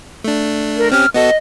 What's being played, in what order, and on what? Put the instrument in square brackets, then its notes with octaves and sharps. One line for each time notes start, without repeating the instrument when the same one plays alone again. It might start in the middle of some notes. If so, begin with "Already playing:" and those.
[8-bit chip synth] A3 D4
[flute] A#4
[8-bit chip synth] C4 C#4 G4 [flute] F6
[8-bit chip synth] B3 F#4 A4 [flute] D#5